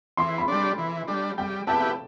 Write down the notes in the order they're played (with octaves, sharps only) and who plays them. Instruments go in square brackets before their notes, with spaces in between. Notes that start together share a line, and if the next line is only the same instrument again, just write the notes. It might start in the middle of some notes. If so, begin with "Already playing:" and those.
[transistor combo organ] E3 [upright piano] C6
[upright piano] B5
[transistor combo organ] G3 D4
E3
G3 D4
[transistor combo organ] G3 [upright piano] G5
[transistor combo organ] B3 E4 G4 [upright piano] A5